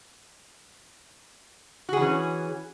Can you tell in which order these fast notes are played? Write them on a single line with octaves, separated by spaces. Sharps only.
F#4 G#4 E3 C#4